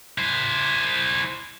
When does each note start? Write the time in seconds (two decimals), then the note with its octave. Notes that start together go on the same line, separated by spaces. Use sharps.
0.18 E4 C5